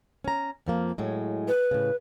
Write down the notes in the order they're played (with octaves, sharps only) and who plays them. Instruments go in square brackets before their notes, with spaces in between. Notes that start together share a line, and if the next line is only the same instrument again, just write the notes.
[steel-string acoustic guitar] C#4 A#5
F2 F3 A#3
A2 F#3 G#3
[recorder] B4
[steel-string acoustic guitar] A2 C#3